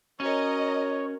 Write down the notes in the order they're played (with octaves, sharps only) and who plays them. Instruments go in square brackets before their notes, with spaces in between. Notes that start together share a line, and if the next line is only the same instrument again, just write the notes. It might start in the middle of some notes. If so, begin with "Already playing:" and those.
[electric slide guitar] C#4 [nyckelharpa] F#4 A#4 [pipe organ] C#5 [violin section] D#5 A#5